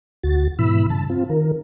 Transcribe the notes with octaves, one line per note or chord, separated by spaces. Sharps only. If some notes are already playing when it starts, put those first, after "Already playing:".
D2 F#4 A6
G#2 B2 E3 E4 B5 E6
G2 C#3 A5
C4 F4
D#3 A#4